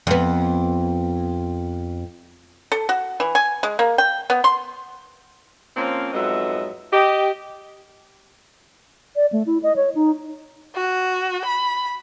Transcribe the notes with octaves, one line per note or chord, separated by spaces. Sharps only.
F2 B3
A4
F#4
E3
G#5
G#3
A#3
G5
B3
C6
F3 A#3 C4 C#4
F2 G#2 F#3 B3 D#5 E5
G4 D#5
D5
A3
E4
D#5
C#5
D#4
F#4
B5